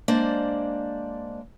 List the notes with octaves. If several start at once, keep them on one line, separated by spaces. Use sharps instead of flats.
G#3 A#3 D4 C5 D5